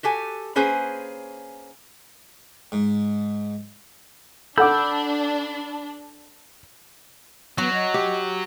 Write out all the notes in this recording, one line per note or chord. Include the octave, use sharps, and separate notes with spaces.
F#4 G4 A4 G#5
A#3 C#4 G#4 B4 C5
G#2
D4 A4 F#5 B5 D6 E6 G6
F#3 B3 F#4
D#5
G4